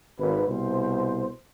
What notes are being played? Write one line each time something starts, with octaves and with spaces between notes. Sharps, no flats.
G#1 B4
C2 B2 C5